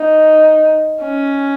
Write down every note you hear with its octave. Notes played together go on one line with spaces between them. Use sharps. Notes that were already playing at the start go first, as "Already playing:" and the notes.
Already playing: D#4
C#4